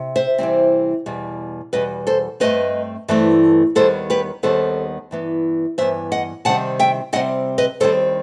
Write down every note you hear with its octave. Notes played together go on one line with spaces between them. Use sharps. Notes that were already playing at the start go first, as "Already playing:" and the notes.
Already playing: C3
C5 E5
C3 E3 G3 C4
E2 B2 G3
E2 B2 G3 B4 D#5
A4 C5
G2 E3 A3 C4 B4 D#5
G2 E3 A3 C4
D#2 D#3 G3 B3 A4 C5
G4 B4
D#2 D#3 G3 B3 A4 C5
G2 E3 B3
G2 E3 B3 C5 E5
D#5 F#5
C3 D#3 G3 C4 F#5 A5
E5 G5
C3 D#3 G3 C4 D#5 F#5
B4 D#5
D#2 D#3 G3 C4 A4 C5